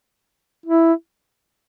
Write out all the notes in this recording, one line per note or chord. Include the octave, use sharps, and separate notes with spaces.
E4